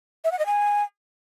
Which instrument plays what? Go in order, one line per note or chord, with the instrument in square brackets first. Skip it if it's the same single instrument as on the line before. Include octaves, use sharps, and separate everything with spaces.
[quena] E5
F#5
D#5
G#5